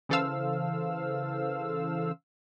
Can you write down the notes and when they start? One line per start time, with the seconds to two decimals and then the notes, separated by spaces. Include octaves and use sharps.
0.09 C#3 E3 A4 C5 F5 E6